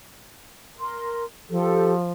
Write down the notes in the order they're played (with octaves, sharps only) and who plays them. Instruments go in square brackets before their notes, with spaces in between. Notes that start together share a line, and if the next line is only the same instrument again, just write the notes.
[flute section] A#4 C6
[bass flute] F3 [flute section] G4 A4